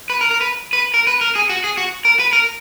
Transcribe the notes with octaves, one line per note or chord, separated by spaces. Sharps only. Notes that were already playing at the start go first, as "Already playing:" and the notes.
B4
A#4
A#4
B4
B4
A#4
B4
A#4
G#4
F#4
G#4
F#4
A#4
B4
A#4